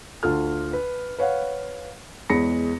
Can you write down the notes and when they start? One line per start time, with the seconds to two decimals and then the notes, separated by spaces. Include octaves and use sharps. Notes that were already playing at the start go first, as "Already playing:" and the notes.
0.23 D2 F4 A4 F6
0.73 B4
1.19 B4 C#5 F5 F#5
2.30 E2 G#3 C#5 B5 A#6 C#7